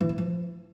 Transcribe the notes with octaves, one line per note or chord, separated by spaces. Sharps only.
E3
E4
F3